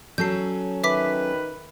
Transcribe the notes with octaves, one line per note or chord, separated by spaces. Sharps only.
F#3 C#4 A4 G6 C7
D#3 B4 E5 D6 B6